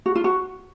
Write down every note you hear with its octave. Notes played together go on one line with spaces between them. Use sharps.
F#4
F4
F#4